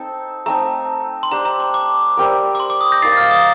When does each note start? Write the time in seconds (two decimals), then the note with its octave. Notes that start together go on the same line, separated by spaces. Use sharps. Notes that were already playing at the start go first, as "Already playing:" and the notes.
Already playing: C4 D#4 A4
0.46 A3 C4 D#4 A#5
1.23 C6
1.31 D4 G4 C5 A#5
1.45 A#5
1.60 C6
1.74 D6
2.17 G3 C4 G4 A#4
2.55 D6
2.60 C6
2.70 D6
2.81 D#6
2.92 G6 A#6
3.02 D#4 A#4 F5 A6 C7
3.17 F6
3.31 D#6